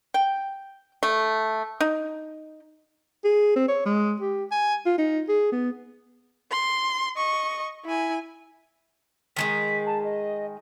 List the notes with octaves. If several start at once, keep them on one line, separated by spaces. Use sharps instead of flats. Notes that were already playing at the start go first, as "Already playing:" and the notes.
G5
A3
D#4
G#4
C4
C#5
G#3
G4
G#5
F4
D#4
G#4
B3
C6
D#5 C#6
E4 G#5
D#3 F#3 G#3 B6
A5
D#5